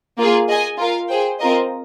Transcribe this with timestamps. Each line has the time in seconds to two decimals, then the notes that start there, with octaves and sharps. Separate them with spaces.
0.18 A#3 F4 G#4
0.48 G#4 D#5 G#5
0.78 F4 A#4 F5
1.09 G#4 C5 G5
1.39 C4 F4 A#4 D#5